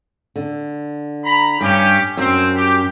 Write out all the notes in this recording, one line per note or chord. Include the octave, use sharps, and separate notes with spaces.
D3
A#5 B5
G2 C#4 G4
F#2 C4
G4